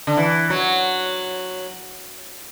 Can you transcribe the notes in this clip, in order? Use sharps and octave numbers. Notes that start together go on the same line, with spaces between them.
D3
E3
F#3